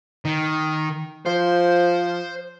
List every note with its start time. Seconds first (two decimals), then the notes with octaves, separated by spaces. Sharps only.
0.25 D#3
1.26 F3 C5